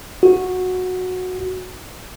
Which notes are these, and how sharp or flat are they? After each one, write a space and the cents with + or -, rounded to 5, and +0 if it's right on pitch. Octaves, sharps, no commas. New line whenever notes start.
F#4 -10